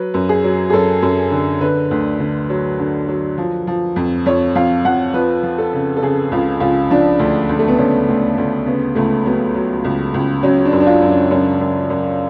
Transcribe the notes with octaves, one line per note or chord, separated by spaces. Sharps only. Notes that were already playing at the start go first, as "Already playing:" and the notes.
Already playing: F#3 B4
F#2
G#4
F#3
G#4
F#2 A4
F#2
D3
D3 B4
D2
D3
F#3
D3
F#3
F3
F3
F2
F2 C#5
F2 F5
F2 F#5
F3 B4
F3
A4
C#3
A4
C#3 G#4
C#2 F4
C#2 F4
F3 D4
D2
D2
A3
B3
D2 C#4
D2
D2
C#3 B3
C#2 A3
F#3 B3
F#3
C#2
C#2
F#3 C#4
D4
F#2
D4
F4
F#2
C#4
F#2 C#4
F#2
F#2